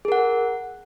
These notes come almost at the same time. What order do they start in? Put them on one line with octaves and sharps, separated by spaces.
G#4 A#4 F#5